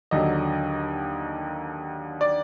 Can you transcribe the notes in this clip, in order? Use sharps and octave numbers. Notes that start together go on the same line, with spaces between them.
D#2 D3 F#3 D#5
D5